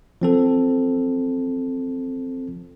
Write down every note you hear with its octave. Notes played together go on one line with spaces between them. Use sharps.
F3 C4 A4